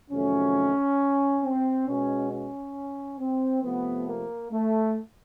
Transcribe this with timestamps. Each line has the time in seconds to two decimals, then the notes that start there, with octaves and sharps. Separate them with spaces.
0.10 F2 C3 D#3 F#3 A3 C#4
1.43 C4
1.87 B2 G#3 C#4
2.31 C#4
3.19 C4
3.63 C3 F3 A3 B3
4.07 A#3
4.51 A3